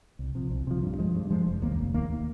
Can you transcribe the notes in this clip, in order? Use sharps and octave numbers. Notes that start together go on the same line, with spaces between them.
C2
C3 F3
C2
C3 F3
G2
F3 G#3
G2
F3 G#3
F1
D#2 D#3 A#3
F1
D#2 D#3 A#3